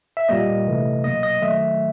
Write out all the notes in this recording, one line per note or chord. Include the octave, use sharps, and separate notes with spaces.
E5
A#2 G3 A#3 D#5
C3 E3 A3
B2 F#3 A#3 D#5
D#5
D#3 F#3 A3 E5